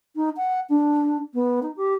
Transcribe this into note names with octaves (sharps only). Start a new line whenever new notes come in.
D#4
F#5
D4
B3
D#4
G4